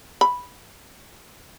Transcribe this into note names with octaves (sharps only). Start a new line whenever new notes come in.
B5